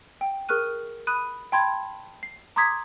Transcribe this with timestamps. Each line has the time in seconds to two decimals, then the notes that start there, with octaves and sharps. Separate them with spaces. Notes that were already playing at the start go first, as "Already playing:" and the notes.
0.21 G5
0.49 G#4 A#4 C#6 F6 F#6 D#7
1.07 B5 D#6 F#6 D#7
1.52 G5 A5 B5 C6 G#6
2.23 C7
2.56 A#5 C6 D6 D#6 G#6 B6